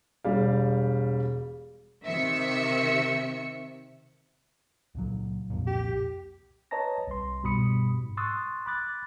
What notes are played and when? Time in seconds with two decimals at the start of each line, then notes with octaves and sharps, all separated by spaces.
0.24 E1 G3 F5
2.06 C3 D#3 E5 C#7
4.95 C#2 A#2 F#3
5.50 C2 F2 A#2
5.67 G4
6.71 B4 C#5 D#5 A5 A#5 A#6
7.07 C2 C6
7.43 G2 B2 G3 B5 D#6 C#7
8.02 G#2
8.17 C6 C#6 D#6 E6 F#6 A6
8.66 B5 D6 F#6 A6